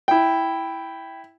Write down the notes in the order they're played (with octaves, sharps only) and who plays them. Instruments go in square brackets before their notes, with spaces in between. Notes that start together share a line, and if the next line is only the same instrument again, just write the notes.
[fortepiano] E4 G5